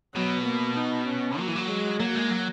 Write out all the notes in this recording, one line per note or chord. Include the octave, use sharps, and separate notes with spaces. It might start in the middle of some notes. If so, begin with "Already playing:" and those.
B2 F#3
A#3
D#4
C#4
F#3 A#3
E3
F#3
G#3
F#3 A#3
G#3
F#3